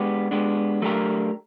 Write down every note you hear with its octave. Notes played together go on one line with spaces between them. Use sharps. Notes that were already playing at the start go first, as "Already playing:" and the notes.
Already playing: G#3 B3 D4 G4
G#3 B3 D4 G4
F#3 A3 D4 G4 A#4